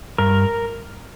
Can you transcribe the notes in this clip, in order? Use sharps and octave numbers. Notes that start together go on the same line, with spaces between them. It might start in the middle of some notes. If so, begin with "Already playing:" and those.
G2 A#4